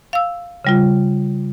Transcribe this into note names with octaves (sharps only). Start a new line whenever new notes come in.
F5 E6
C#3 G3 F4